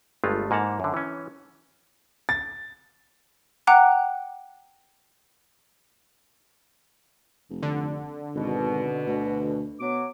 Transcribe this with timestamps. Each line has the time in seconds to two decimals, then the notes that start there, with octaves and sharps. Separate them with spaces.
0.24 G1 G2 G#3 A3 F4
0.51 G#2 A#3 F#5 A5 A#5
0.80 F#2 D3
0.94 E3 C#4
2.29 A6
3.67 F#5 G5 A#5 D6 F#6
7.50 F1
7.63 D3
8.35 G#1 B2
9.07 D2
9.80 B2 F#3 D6